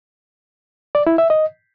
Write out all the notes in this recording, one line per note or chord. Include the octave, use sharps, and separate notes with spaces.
D5
E4
E5
D#5